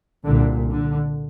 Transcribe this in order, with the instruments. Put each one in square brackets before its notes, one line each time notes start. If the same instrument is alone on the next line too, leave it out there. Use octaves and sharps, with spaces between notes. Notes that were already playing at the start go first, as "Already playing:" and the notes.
[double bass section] C2 A#2 D3
D3